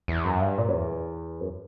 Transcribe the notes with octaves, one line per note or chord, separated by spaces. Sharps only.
E2
F#2
G2
A#2
F#2
E2
F#2